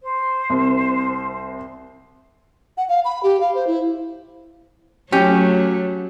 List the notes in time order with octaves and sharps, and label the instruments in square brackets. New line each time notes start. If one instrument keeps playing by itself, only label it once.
[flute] C5
[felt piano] C2
[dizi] F#5
F5
B5
G4
F5
C5
E4
[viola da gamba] F#3 A3 [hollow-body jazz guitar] C#4 G4